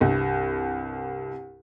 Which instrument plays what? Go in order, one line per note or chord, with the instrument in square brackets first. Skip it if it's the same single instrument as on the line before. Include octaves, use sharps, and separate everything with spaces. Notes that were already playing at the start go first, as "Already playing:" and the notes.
[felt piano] C2 G2